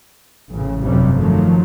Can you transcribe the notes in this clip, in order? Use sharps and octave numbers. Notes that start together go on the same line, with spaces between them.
A1 C#3
G1 F2 C3 F#3 G3
D#3 F3 F#3 A3